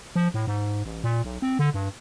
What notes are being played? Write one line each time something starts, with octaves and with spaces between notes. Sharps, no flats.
F3
A2
G#2
A1
A#2
B1
C4
D3
G2